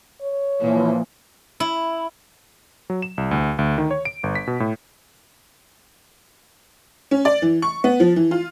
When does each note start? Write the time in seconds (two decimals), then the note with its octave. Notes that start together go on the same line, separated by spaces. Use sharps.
0.22 C#5
0.60 A#2 E3 F3 A#3
1.60 E4
2.90 F#3
3.02 E7
3.18 C2
3.31 D2
3.59 D2
3.78 D#3
3.91 C#5
4.05 D7
4.23 G1
4.35 B6
4.47 B2
4.60 A2
7.11 C#4
7.25 D5
7.42 E3
7.62 C#6
7.84 B3
8.00 F3
8.16 E3
8.31 F4